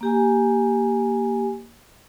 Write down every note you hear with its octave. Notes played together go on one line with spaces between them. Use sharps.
A#3 G4 G#5